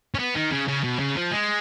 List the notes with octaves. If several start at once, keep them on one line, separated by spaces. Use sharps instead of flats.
C#4
B3
D#3
C#3
C#3
B2
C#3
F3
G#3